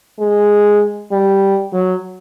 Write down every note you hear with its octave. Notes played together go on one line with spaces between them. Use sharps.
G#3
G3
F#3